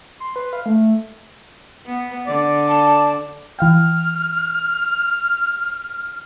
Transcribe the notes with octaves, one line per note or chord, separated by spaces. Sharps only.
C6
B4
F5
A3
B3
D3 D5
A5
E3 F5 G5 F6